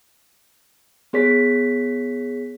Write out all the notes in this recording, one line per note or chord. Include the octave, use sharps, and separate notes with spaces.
B3 G#4 C#5 B6